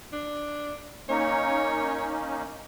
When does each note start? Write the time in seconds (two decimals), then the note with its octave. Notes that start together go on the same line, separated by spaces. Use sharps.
0.13 D4
1.09 A#3 C#4 D#4 C#5